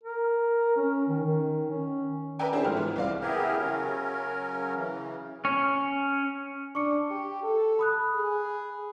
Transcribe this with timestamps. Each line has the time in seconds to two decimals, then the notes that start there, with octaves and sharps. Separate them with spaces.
0.03 A#4
0.76 C#4
1.08 D#3
1.24 D#3
1.70 C#4
2.39 A#4 B4 D5 E5 G5 G#5
2.53 C4 D4 E4 G4 G#4 C5
2.64 G#2 F3 A3 F6
2.77 E3 B3
2.96 C2 C4 D5 F5
3.20 B3 E4 G4 G#4 A#4
3.57 C#3 F#3 C#4 A#4
4.75 C#3 E3
5.45 C#4
6.75 D4 C#6 D6 C#7
7.11 G4
7.43 A4
7.79 B5 D#6 F#6
8.15 G#4